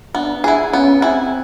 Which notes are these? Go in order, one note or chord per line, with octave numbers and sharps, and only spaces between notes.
B3 D4
E4 G#4
B3 C#4
C4 E4 G#4